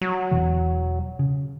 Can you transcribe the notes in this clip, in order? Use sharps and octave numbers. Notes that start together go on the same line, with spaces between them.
F#3
E1 B2 E3
C#3